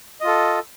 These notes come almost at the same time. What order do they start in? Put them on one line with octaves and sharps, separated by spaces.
D#5 F4 A4